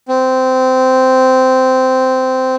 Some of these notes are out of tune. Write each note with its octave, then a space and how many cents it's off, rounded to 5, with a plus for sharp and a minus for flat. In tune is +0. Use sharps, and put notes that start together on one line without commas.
C4 -15